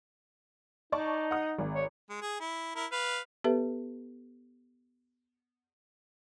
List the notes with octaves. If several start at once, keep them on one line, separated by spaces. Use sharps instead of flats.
D#4 D5 A5 C#6
F#5 D#6
G#1
C#5
G#3
G#4
E4
E4 A#4
B4 F5
B3 G4 A4 B4 E5